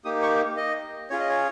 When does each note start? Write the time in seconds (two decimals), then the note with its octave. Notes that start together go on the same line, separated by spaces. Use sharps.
0.05 A#3 D#4 G4 D#6
0.22 C#6
0.57 D#5
1.10 C#4 F4 G#4 C#5
1.20 D#5
1.29 C#5